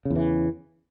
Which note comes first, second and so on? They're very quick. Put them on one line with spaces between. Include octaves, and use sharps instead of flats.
C#3 E2 E3